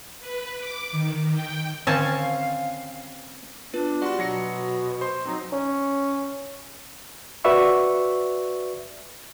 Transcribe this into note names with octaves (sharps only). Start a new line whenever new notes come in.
B4
D6
D#3
G5
D3 D#3 C4 C#4 C5 F5 G#5 A5
B3 D4 F4 B4
G3 F#4 D5 C6
B2 F#3 A#6 C#7
C5 C6
F#3 C4 D#4
C#4
F#4 B4 D5 E5 C#6